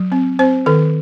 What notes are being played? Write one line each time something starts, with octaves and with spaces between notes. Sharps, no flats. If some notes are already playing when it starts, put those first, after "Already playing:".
Already playing: F#3
C4
C4 C5
D#3 A4